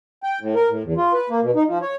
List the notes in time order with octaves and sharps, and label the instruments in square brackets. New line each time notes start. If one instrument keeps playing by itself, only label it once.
[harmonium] G5
A2
A#4
A2
E2
F4
B4
A#3
B2
D#4
F3
C#5